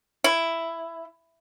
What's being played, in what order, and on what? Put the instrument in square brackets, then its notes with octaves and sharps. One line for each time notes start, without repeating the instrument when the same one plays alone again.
[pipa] E4